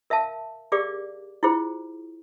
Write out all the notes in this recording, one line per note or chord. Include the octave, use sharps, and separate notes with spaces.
A#4 E5 F5 A5
G4 G#4 A#4 D5 F5 D6
E4 F4 G#4 C5